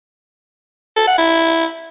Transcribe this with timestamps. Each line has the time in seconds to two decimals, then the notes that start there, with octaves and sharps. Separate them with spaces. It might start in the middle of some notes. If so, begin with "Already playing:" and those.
0.96 A4
1.07 F#5
1.18 E4